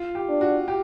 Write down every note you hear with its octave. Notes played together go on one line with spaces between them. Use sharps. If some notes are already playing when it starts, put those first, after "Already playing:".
Already playing: F4
G4
D4
F#4
G4